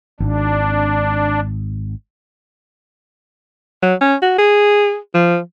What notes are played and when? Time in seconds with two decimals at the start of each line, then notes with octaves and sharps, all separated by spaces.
0.20 G#1 D4
3.82 F#3
4.01 C#4
4.22 F#4
4.38 G#4
5.14 F3